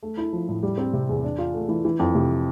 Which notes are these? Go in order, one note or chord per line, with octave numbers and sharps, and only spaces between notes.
A3
E4
F3
A2
G3
C4
C3
E2
D4
F4
A3
E3
E3
F2
C3